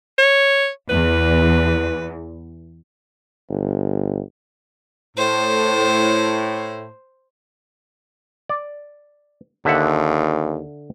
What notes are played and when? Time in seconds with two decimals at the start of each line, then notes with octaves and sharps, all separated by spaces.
0.18 C#5
0.89 E2 B4
3.50 G1
5.17 A2 C5
8.49 D5
9.65 D#2 D3 E5 F#5